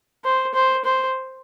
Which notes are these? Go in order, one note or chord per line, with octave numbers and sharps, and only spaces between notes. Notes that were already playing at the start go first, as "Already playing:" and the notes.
C5
C5
C5